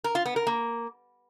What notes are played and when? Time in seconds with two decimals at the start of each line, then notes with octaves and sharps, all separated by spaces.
0.04 A#4
0.15 F4
0.26 B3
0.36 A#4
0.47 A#3